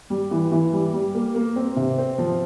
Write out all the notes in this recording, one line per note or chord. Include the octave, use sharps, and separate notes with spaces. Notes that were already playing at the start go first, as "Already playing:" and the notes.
G3
E3
E3
G3
G3
A#3
A#3
C4
C3
C4
F3